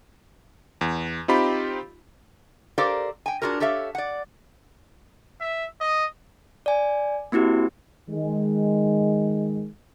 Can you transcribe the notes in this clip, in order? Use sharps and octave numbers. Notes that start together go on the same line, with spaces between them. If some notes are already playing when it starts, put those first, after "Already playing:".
E2
C4 D#4 F4 G4 B5
G4 A4 A#4 C5 D5 F5
G5 G#5
D4 F4 F#4 G#4 A#4
G4 A4 C#5 E5 F5
D5 F#5
E5
D#5
D5 G#5
A#3 C4 E4 F#4 G4
D#3 G#3